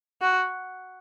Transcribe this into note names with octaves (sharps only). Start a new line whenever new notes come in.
F#4